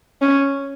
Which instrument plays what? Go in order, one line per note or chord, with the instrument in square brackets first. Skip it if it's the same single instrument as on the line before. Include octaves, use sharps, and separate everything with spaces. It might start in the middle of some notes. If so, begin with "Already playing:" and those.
[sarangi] C#4